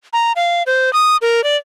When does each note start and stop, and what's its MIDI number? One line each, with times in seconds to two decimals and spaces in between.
0.13 0.32 82
0.36 0.63 77
0.67 0.92 72
0.93 1.17 87
1.22 1.44 70
1.44 1.56 74